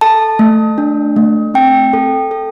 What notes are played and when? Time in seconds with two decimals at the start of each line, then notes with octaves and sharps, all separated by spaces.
0.01 A4 A5
0.39 A3
0.78 D4
1.16 A3
1.54 C4 G5
1.93 A4
2.31 A4